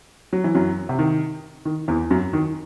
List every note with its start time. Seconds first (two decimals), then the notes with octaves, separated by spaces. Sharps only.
0.33 F#3
0.44 E3
0.55 F#2 F#3
0.89 C3
0.99 D#3
1.65 D#3
1.88 E2 E3
2.10 F#2 F#3
2.33 D#3